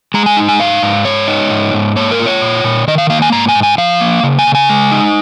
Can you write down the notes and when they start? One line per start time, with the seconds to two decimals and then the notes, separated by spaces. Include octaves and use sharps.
0.14 G#3 A#5
0.26 G#5
0.37 D#4
0.49 G#5
0.60 G#2 F5
0.83 G#2
1.05 G#3 C#5
1.28 D#4
1.50 G#2
1.74 G#2
1.96 A#3 C#5
2.11 A#4
2.19 F4
2.26 C#5
2.42 A#2
2.64 A#2
2.87 D#3 D#5
2.98 F5
3.10 A#3 F5
3.22 G#5
3.32 G#2 A#5
3.49 G#5
3.55 G#2
3.63 G#5
3.78 F3 F5
4.01 A#3
4.23 C#3
4.39 G#5
4.47 C#3
4.55 G#5
4.69 G#3
4.92 D#4